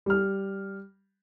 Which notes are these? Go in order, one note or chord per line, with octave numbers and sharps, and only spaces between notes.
G3 F6